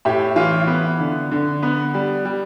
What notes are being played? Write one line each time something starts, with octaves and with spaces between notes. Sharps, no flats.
A2 E4 G4
E3 F4
B3
D3
D3
B3
G3
G3